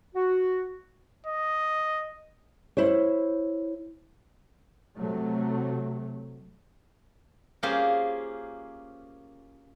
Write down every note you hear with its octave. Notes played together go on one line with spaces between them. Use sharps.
F#4
D#5
E4 C5 C#5
C3 F#3 A3
A#3 C#4 F4 G4 G#4 C5